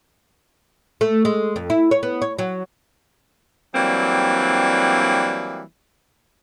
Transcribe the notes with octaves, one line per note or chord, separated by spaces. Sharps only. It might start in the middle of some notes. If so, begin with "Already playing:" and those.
A3
G#3
F2
E4
C#5
B3
C#5
F#3
E3 F#3 G3 A#3 C4 D4